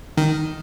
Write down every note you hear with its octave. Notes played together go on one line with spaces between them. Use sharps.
D#3